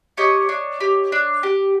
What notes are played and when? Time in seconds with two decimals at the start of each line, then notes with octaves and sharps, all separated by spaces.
0.17 G4 C#5 D#5
0.49 D4
0.80 G4
1.12 D4
1.43 G4